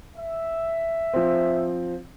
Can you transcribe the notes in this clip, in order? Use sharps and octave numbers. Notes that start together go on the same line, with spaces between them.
E5
F3 C4